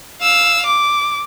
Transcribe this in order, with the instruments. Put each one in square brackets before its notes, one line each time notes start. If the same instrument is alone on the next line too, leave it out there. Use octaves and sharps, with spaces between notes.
[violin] F5 E6
D6